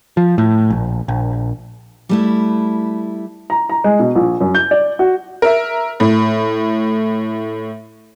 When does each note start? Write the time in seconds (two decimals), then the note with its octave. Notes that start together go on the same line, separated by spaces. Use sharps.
0.17 F3
0.38 A2
0.70 A#1
1.08 A#1
2.09 G3 A3 E4
3.50 A#5
3.70 A#5
3.84 G#3
3.99 B2
4.15 A#1
4.41 F#2
4.55 G6
4.71 D5
4.99 F#4
5.42 A#4 E5
6.00 A2